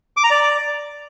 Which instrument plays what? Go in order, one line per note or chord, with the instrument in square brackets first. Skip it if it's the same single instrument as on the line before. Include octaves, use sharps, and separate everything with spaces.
[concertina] D6
A#5
D5